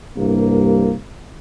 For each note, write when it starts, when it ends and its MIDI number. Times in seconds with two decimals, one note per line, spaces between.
0.17 0.94 36
0.17 0.94 43
0.17 0.94 58